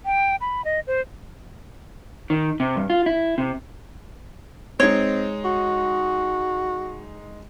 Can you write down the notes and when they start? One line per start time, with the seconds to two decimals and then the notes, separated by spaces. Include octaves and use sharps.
0.05 G5
0.41 B5
0.65 D#5
0.87 C5
2.30 D#3
2.60 C3
2.76 G2
2.90 F4
3.06 E4
3.38 C3
4.80 G#3 C4 D#4 C#5
5.45 F#4